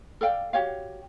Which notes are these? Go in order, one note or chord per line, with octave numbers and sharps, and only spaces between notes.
A4 D5 F5 G5
F#4 G4 C#5 F5